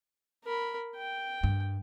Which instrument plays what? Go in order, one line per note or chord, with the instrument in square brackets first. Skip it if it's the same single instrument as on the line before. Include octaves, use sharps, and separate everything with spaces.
[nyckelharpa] A#4 B5
G5
[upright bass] G2